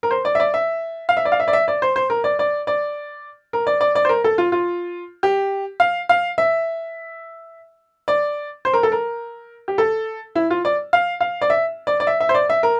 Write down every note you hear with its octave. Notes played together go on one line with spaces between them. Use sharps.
A#4
C5
D5
E5
D5
E5
F5
E5
D5
F5
E5
D5
E5
D5
C5
C5
A#4
D5
D5
D5
A#4
D5
D5
D5
C5
A#4
A4
F4
F4
G4
F5
F5
E5
D5
C5
A#4
A4
A#4
G4
A4
E4
F4
D5
F5
F5
D5
E5
D5
D5
E5
E5
C5
D5
E5
A#4